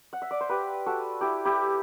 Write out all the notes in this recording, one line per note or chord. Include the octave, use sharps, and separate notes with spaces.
F#5
E5
D5
C5
G4 B4
F#4 A4
E4 G4
E4 G4